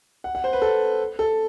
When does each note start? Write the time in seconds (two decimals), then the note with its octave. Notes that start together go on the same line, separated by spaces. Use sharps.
0.24 F#5
0.35 F#5
0.44 C5
0.53 B4
0.62 A4
1.19 A4